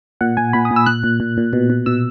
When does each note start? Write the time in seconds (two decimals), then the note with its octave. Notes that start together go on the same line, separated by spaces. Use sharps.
0.21 A#2 F#5
0.37 A#2 G#5
0.53 A#2 B5
0.65 D#6
0.71 A#2
0.76 E6
0.86 A#2 F#6
1.03 A#2
1.20 A#2
1.38 A#2
1.53 B2
1.70 B2
1.86 B2 E6